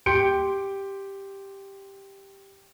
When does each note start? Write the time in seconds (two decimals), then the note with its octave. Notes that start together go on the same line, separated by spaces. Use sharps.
0.06 G4 C6 G6 C#7 D7